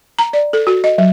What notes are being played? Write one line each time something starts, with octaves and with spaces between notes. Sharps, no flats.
A#5
D5
A4
F#4
D#5
F#3